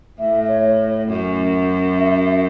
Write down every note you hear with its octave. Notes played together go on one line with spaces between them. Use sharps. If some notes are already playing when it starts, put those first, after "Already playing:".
A2 E5
C#5
F#2
E5